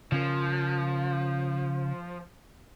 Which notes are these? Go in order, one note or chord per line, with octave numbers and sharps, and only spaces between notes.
C#3 F3 C#4 A#4